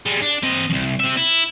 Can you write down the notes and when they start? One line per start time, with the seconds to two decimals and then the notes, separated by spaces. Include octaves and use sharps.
0.06 G3 G#3
0.22 D4
0.43 C4 D#5
0.70 C2 F2
0.99 C4 E5
1.17 E4